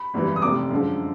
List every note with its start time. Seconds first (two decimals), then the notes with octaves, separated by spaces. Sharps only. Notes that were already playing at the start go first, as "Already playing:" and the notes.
Already playing: B5
0.14 G#1 F#2 C#3 E3 G3
0.36 D#6
0.42 F1 F2 C3 D6
0.70 F#2 D3 F3 G#3